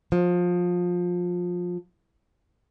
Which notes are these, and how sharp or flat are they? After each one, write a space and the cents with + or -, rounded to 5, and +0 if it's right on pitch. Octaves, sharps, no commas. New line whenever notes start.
F3 +20